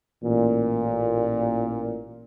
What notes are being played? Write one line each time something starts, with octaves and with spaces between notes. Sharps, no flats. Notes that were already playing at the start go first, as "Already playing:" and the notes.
A1 A#2